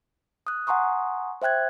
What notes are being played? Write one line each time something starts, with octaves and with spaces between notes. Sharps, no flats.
D#6 F#6
F#5 G#5 A#5 C6 C#6 D#6
C5 E5 G5 F#6 G#6